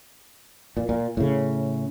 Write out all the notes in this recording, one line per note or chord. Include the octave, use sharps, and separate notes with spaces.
A#2
A#2
A2 C#3